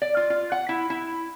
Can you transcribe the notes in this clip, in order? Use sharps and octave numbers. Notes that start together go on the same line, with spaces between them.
D5
F4
F4
F#5
E4
E4